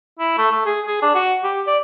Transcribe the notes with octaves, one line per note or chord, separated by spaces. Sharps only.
E4
A3
A3
G#4
G#4
D4
F#4
G4
D5